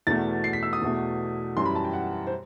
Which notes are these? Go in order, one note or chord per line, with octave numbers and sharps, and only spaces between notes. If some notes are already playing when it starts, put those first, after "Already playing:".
E2 B2 A3 A6
C7
B6
E6
D#6
E2 B2 A3
F#2 E3 G3 C6
B5
A5
G5
F#5
C5